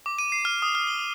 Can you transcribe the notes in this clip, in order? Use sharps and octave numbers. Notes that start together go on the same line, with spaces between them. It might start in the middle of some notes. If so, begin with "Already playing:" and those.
D6
D#7
C7
F6
D#6
F6
G7